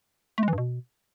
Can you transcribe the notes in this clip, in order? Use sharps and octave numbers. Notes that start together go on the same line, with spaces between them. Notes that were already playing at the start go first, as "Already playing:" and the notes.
A3
G#3
E3
G2
B2